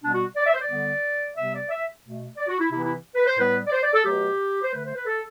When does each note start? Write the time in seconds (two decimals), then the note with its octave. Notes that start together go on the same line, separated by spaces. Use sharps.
0.02 B2 G3 B3 D4
0.13 F#4
0.36 D5
0.47 E5
0.54 C5
0.58 D5
0.69 D3 G3 B3
1.36 C3 G3 B3 E5
1.53 D5
1.69 E5
2.04 B2 A3
2.37 D5
2.48 F#4
2.59 E4
2.71 C3 E3 B3 E4
2.82 E4
3.15 B4
3.27 C5
3.38 A2 G3 B3 B4
3.67 D5
3.72 C5
3.83 D5
3.94 A4
4.05 B2 F#3 A3 G4
4.62 C5
4.72 D3 A3 B4
4.84 C5
4.95 B4
5.06 A4